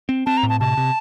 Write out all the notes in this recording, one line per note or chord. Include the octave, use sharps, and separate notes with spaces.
C4
C4 A5
A#5
A2
A5
C3 A5
C3